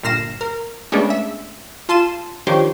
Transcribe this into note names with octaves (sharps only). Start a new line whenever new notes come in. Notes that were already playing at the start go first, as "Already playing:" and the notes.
G1 A#2 F6 A#6 C7 E7
A#4
G#3 A3 B3 C#4 D4 G#4
E5
F4 A5 C6 D#7 E7
D#3 F3 D4 G4 C5 C#5